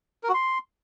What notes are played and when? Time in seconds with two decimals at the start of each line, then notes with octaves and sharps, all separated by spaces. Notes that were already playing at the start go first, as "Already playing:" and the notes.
0.24 A#4
0.29 F#4
0.34 C6